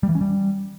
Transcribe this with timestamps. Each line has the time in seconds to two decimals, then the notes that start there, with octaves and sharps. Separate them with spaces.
0.03 G3
0.09 E3
0.15 C#4
0.21 G3